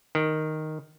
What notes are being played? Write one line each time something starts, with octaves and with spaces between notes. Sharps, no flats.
D#3